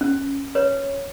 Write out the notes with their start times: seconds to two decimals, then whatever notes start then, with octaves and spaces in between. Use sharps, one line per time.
0.01 C#4
0.55 B4 C#5